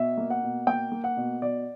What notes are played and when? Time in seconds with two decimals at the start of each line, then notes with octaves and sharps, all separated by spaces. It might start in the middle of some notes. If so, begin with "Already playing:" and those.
Already playing: B2 E5
0.17 A#3
0.30 F#5
0.43 B2
0.67 A#3 G5
0.92 A#3
1.04 F#5
1.17 B2
1.42 B2 D5